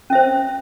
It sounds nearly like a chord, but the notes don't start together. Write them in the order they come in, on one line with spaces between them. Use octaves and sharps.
C#4 E5 C5